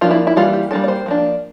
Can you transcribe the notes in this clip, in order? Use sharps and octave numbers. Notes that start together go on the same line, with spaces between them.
F3 A#3 D4 F4
E4
E4
E3 G3 A#3 F4
G4
G3 A#3 D4 A4
D5
C5
F3 A#3 D4